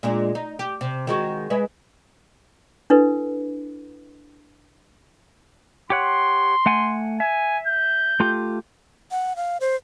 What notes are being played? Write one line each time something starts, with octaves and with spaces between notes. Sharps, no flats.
A#2 G#3 D4
D#4
G4
C3
D#3 G#3 F#4
G#3 B4 E5
D4 E4 A4 B4
G4 C#5 F#5 C6
A3 F#5 G#5
E5 G#5
G6
A3 F4 G4
F#5
F5
C5